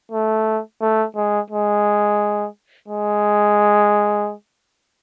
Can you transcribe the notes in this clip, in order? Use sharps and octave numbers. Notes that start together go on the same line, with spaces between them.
A3
A3
G#3
G#3
G#3